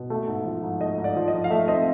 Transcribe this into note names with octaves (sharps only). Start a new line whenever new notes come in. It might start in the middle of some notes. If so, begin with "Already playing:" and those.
Already playing: B2
A3
G#2
F3
G#2
A3 D#5
G#2
D5
F3
D#5
G#2
F5
A3 E5
C4 D#5